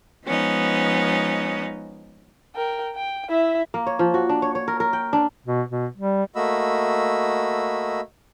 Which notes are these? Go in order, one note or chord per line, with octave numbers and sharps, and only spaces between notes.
F3 G#3 B3 C#4 D#4
A#4 G5
G5
E4 E5
A#3
C#5
F3
F#4
D4
C#5
C#5
A#4
A#4
G5
D4
B2
B2
G3
A3 A#3 F#4 D#5 B5 E6